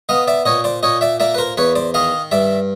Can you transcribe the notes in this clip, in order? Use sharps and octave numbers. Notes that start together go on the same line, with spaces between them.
B3 D#5 F5
D5 E5
A#2 C#5 D#5
C5 D5
A#2 C#5 D#5
D5 E5
A#3 D5 E5
B4
A#4 C5
E2 B4 C#5
C5 D5
D#3 D#5 F5
G2 D5 E5